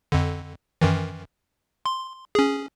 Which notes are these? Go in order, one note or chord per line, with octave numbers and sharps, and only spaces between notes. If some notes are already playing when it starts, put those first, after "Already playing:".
F2 D3
F#2 D#3 E3
C6
C#4 G#4